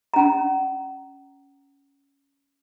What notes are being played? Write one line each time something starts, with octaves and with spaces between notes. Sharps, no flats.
C#4 A#5